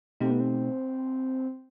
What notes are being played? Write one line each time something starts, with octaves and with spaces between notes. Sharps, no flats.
B2 A3 C4 D#4 G4
B3
C4